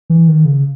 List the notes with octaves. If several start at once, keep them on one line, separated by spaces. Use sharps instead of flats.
E3
D#3
C#3